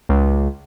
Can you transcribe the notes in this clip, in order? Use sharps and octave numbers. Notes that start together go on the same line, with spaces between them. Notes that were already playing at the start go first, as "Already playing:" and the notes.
C#2